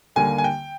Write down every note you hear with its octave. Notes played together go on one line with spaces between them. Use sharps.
D#2 D3 G3 A#3 G#5
G#5
G5